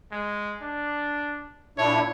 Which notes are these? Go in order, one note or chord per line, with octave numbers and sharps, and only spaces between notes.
G#3
D4
A#2 D4 E4 C#5